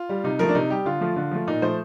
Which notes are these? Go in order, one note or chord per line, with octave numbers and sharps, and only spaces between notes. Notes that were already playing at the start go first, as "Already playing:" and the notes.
Already playing: F4
G3
C3 D#4
F3 A3 A#4
D4
C3 D#4
G3 G4
D3 F4
F3 A3
D3
F3 A3
A#2 D#4
F3 A3 C5